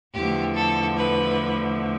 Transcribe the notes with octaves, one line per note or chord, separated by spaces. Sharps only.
E2 D3 F3 A3 G4
A4
B4